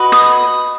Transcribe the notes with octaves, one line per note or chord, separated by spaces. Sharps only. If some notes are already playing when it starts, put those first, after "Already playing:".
Already playing: F#4 B4 D#5
D#6